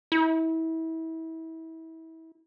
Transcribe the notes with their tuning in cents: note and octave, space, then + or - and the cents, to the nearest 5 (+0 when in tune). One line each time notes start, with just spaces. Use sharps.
E4 -30